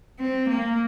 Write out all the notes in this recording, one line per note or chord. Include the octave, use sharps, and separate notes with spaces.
C4
A#3